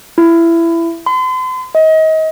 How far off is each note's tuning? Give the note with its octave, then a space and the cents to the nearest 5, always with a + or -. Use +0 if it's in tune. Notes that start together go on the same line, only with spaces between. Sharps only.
E4 +20
C6 -40
D#5 +30